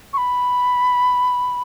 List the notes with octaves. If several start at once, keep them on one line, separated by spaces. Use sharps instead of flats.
C#6
B5